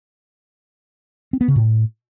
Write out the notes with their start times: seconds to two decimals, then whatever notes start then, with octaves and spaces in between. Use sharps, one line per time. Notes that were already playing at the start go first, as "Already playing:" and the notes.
1.33 C4
1.41 B3
1.48 C#3
1.56 A2